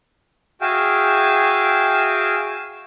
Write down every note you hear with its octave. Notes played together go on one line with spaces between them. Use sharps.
F#4 G#4 E5 F5 G5 G#5